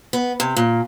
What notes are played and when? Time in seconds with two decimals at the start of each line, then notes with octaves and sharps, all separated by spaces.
0.13 B3
0.40 C3
0.57 A#2